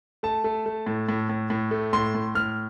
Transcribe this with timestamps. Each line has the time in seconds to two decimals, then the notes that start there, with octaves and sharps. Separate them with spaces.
0.23 A3 A5
0.44 A3
0.66 A3
0.87 A2
1.09 A2
1.29 A2
1.50 A2
1.71 A3
1.93 A2 C6
2.15 A2
2.35 A2 F6